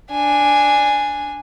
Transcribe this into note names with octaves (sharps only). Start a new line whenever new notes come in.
D4 G#5